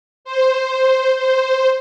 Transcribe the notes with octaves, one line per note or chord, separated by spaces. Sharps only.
C5
C5